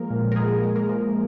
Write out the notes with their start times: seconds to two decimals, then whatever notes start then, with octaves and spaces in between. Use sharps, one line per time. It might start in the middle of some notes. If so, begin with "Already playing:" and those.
Already playing: F3 G#3 A#3 A#4
0.10 A#2
0.32 A#4
0.36 A#2 G#3 G#4
0.63 G#3
0.76 A#3 A#4
0.89 F3